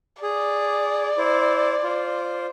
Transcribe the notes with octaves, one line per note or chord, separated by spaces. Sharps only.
G#4 D5
E4 C5
F4 C5